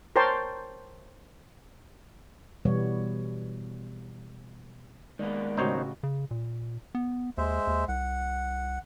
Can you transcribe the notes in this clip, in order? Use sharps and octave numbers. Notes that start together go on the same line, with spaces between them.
A#4 C5 C#5 G5 A5 C6
B2 E3 G3 B3 C#5
D#3 G#3 A#3 B3 D5
A1 C#3 D#4 F#4 C5 C#5
C#3
A#2
B3
D#2 G#3 C5 E5
D#2
C2 F#5